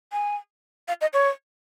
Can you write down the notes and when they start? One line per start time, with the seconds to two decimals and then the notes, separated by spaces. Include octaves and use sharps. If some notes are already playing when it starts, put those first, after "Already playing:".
0.12 G#5
0.88 F5
1.01 D#5
1.13 C#5